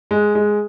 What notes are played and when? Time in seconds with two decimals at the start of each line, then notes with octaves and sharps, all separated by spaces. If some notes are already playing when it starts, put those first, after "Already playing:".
0.11 G#3
0.35 G#3